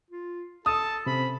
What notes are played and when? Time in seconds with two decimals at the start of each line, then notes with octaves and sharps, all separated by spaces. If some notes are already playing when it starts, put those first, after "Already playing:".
0.11 F4
0.66 A4 A5 D#6
1.06 C3 C#4 C5 B5